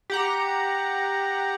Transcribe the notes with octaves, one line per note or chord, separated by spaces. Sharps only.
G4 F#5 A#5